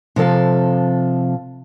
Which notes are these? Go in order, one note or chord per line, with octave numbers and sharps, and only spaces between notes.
C3 F3 A4 F5